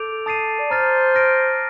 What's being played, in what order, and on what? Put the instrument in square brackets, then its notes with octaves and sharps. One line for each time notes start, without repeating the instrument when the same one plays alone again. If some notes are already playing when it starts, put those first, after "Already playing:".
Already playing: [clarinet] A4 [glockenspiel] D6 G6 D7 F7
[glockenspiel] A5 D#6 A6 C7 D#7
[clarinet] D5
[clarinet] C5 [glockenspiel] A#5 F6 A6
[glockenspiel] F6 A#6 D7